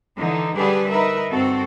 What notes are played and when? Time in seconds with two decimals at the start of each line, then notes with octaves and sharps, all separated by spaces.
0.17 D3 E3 D#4
0.56 D3 G3 D4 G4 G#4 B4
0.90 D#4 A#4 B4 E5
1.31 G2 C4 F#4 A4